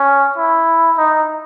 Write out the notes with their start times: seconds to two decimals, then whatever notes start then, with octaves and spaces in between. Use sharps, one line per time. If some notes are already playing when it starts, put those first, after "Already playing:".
Already playing: C#4
0.38 E4
0.98 D#4